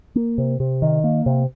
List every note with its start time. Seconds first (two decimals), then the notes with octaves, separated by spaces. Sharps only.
0.16 A#3
0.38 C3
0.60 C3
0.82 D#3
1.04 A#3
1.26 C3